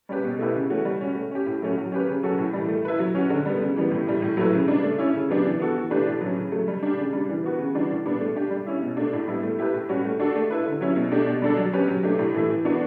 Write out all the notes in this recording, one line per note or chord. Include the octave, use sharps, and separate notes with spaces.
G3 C#4 G4 B4
B2
A3 E4 G4 B4
C#3
E3 A3 C#4 F#4
G3
C#4 F#4
A3
C#4 G4
A2
F#3 A3 C#4 F#4
F#3
C#4 G4 B4
C#3
F#3 C#4 F#4 A4
A2
E3 G3
A3
E4 B4
F#3
C#4 F#4
D3
G3 B3
C#3
E3 G3 B3
A2
E3 G3
A2
F#3 A3 E4 B4
C#3
G3 D4
A3
C#4 E4
C#3
F#3 B3 D4 G4
E3
B3 F#4 A4
E3
A3 D4 G4 B4
A2
F#3
C#4
C#3
F#3 A3
G3
D4 G4
C#3
G3 D4
E3
B3 F#4 B4
C#3
E3 G3 D4 F#4
A2
G3 B3 D4
A3
D4 G4
G3
C#4 E4
B2
A3 D4
A2
G3 B3 E4
A3
E4 G4 B4
A2
G3 C#4 F#4
A3
D4 F#4 A4
A3
E4 B4
D3
F#3 C#4 E4
B2
A3 D4 G4
B2
G3 D4 A4
F#3
C#4 G4 B4
F#3
A3 D4 G4
A2
E3 A3 E4
E3
B3 D4 F#4 B4